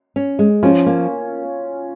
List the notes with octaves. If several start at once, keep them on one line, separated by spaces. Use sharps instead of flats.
C#4
G#3
F3 C#4 F4
A#3